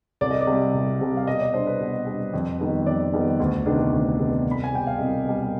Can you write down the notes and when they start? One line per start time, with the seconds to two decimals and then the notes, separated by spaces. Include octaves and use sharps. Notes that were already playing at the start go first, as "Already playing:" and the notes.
0.21 C2 D5
0.31 D#5
0.41 D5
0.47 C3 G3
0.74 C2
1.01 C3 G3
1.17 F5
1.27 B2 D#5
1.40 D5
1.54 G3 D4 C5
1.67 B4
1.81 B2
2.07 G3 D4
2.33 F2
2.60 D#3 G3 B3
2.86 F2 D5
3.13 D#3 G3 B3
3.40 D2
3.66 C3 D#3 B3 D4
3.93 D2
4.19 C3 D#3 B3 D4
4.46 C2
4.51 B5
4.64 G#5
4.72 B2 G3 G5
4.87 F5
4.99 C2 D#5
5.25 B2 G3